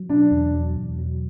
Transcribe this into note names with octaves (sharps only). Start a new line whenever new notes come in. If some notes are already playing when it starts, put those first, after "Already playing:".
Already playing: F#3
B2 D4
E2
F#3
E2
F#3